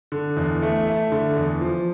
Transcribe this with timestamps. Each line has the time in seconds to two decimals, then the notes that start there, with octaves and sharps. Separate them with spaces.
0.12 D3
0.37 E2
0.62 A3
0.87 E4
1.12 D3
1.37 E2
1.61 F3